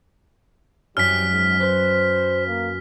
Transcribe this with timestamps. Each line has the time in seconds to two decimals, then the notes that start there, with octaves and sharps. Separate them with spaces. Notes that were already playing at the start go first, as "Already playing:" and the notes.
0.97 F#2 C3 E3 G3 F6 B6
1.30 G#2
1.60 B4 C5
2.47 A#3